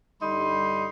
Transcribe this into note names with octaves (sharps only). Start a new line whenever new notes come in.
G2 D3 G3 D#4 B5 C6